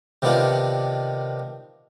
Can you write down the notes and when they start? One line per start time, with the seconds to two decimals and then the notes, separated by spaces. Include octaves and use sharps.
0.22 C3 D#3 B3 D4 F4